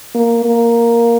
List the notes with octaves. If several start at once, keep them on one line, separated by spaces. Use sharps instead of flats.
A#3
A#3